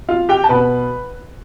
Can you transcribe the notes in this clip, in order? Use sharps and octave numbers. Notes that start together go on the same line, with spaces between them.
F4 F5
G4 G5
A5
B2 B4 B5